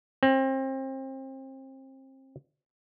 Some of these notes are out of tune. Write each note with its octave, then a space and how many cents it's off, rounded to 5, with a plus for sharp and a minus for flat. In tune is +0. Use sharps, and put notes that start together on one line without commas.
C4 +30